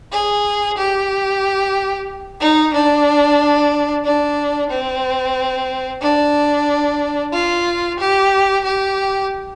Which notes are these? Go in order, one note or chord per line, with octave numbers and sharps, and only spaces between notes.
G#4
G4
D#4
D4
D4
C4
D4
F4
G4
G4